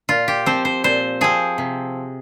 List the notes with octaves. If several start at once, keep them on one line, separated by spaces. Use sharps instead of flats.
A#2 F4
G4
F3 C4 C5
C5
A#2 C5
F3 C4 G#4
C3